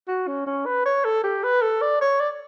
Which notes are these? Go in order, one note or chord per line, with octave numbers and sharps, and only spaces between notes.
F#4
C#4
C#4
B4
C#5
A4
G4
B4
A4
D5
C#5
D5